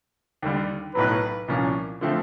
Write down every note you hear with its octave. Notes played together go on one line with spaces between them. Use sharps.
D#2 D3 G3
B1 A2 F#3 B4
C2 A#2 F3 A#3 C#4
D3 F3 A3 C4